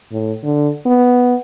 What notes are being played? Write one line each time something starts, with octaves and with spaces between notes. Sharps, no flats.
A2
D3
B3